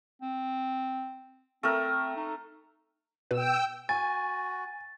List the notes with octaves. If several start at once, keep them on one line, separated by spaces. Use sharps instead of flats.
C4
A3 C4 A#4
D#4
B2 B4 G5 E6
F#4 G#5 A6